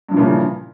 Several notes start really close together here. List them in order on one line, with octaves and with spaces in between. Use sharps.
G2 F3 E3 A#2 C#3